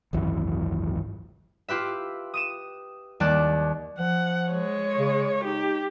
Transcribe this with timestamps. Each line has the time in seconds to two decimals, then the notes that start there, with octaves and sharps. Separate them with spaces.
0.13 G#1 C#2 F#2 E3
1.68 F4 G4 B4 E5
2.34 D#6 D#7 E7
3.20 D#2 G3 D5 A5 F#6
3.99 F3 F#5
4.52 G#3 C#5
4.99 C#3
5.44 D#4 G4